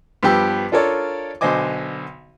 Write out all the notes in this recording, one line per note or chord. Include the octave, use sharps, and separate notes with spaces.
G2 F3 B3 G4 G5 E6
D4 F4 A4 A#4 C#5 D5
B1 D3 C5 D#5 G#5 D6